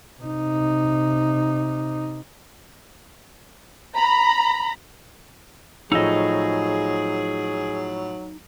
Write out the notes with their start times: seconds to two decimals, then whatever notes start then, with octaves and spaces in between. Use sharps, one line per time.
0.21 C3 D#4
3.96 A#5 B5
5.92 A2 F3 F#3 D#4 G#4 D#5 E6